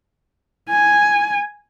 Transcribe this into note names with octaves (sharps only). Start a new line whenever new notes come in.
G#5